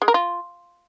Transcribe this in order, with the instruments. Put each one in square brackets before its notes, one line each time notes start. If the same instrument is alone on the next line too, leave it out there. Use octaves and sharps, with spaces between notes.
[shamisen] G#3
A#4
F4